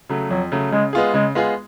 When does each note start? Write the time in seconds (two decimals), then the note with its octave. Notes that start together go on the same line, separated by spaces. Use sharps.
0.09 C#3 F#3 A3
0.30 F2 F#3
0.52 C#3 F#3 A3
0.72 C#3 G#3
0.93 G#3 B3 F4 G#4
1.14 C#3 G#3
1.35 G#3 B3 F4 G#4